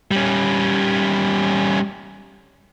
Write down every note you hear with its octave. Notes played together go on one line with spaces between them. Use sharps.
G3 C#4